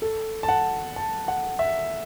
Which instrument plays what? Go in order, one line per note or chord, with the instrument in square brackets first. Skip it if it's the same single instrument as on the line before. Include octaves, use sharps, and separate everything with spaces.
[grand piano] A4
A5
F#5
A5
F#5
E5